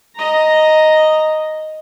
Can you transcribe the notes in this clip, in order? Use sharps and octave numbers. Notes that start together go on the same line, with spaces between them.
D#5 A#5